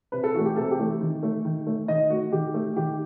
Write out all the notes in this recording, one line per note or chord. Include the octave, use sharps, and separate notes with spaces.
C3 B4
A4
E3 A3 F#4
G4
C3 A4
G4
E3 A3
D#3
A3
D#3
A3
D#3 D#5
A3 F#4
D#3 G4
A3
D#3 G4